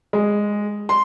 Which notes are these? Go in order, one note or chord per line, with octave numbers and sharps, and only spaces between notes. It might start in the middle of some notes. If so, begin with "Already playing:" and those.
G#3
C6